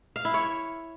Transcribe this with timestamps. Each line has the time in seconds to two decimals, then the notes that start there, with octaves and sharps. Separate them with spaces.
0.16 F5
0.25 E4
0.34 C#5